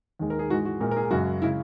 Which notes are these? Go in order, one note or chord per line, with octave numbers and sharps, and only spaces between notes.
D#2 D#3 G#3
A#4
G#4
G#2 E3 G#3 F#4
F#4
A#2 G#3 A#4
A#4
G#4
F#2 C#3 G#3 F#4
C#3 G#3 E4